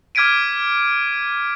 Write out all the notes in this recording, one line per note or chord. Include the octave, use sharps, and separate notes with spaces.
D6 F6 G#6 B6 D7 D#7